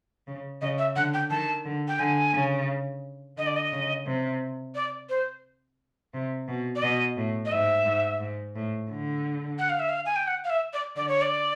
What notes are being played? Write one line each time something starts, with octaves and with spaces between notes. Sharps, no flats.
C#3
C#3 D#5
E5
D3 F#5
G5
D#3 A5
D3
G5
D3 G#5
C#3
D3 D#5
D5
D#5
C#3
C3
D5
C5
C3
B2
D5
B2 D#5
A2
D#5
G#2 E5
G#2
G#2
A2
D3
F#5
F5
E5
F5
G#5
G5
F#5
F5
E5
D5
D3 D5
C#5
D5